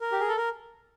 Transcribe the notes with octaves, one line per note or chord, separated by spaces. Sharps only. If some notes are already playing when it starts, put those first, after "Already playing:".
A#4
G4
G#4
A4
A#4